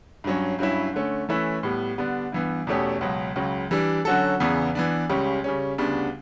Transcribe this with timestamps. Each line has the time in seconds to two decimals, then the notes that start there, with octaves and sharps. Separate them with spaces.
0.24 G2 F#3 C#4
0.59 G2 F#3 C#4 E4
0.93 D3 A3 C#4
1.29 E3 A3 C#4 E4 B4
1.63 A2 G3 B3
1.98 D3 G3 B3 D4
2.32 G2 E3 B3
2.67 E2 B2 A3 C#4 G4
3.01 C#2 B2 F#3
3.36 C#2 C#3 F#3
3.71 E3 G3 D4
4.05 D3 F#3 C#4 F#4 A4
4.40 E2 C#3 E3 B3
4.75 E3 B3 D4
5.09 C#2 C#3 G3 C#4
5.44 C#3 G3 C#4
5.78 D2 C#3 G3 B3 D4